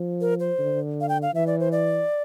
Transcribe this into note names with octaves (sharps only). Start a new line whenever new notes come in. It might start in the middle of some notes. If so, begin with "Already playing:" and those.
Already playing: F3
A#4
C5
D3
F5
G5
F5
E3 E5
D5
C5
D5